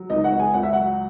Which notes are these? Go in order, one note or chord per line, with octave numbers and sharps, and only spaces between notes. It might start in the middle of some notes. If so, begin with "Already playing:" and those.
Already playing: F#3
C#2 D#4 D#5
F#4 F#5
C#2
G#4 G#5
C#2 F#5
E5
F#3 F#4 F#5